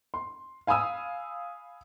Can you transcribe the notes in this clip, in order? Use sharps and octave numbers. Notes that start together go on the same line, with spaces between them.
C6
F5 G#5 B5 D#6 E6